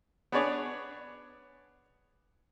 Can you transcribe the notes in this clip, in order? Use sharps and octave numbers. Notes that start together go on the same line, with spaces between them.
B3 D4 G#4 B4 C#5 D5